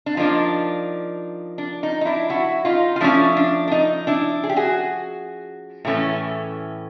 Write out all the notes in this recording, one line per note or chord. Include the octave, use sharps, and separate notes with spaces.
D4
F3 A#3 D4 D#4
D4
D#4
D#4
D4 E4
E4 F#4
D#4 F4
F4
F3 A3 C#4 D4 E4
D4
D4
D#4
D4 E4
G#4
G4
F#4 G#4
A2 E3 A3 C#4